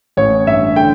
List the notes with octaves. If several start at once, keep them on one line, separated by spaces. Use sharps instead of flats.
A1 C#5
G2 E5
D3 G5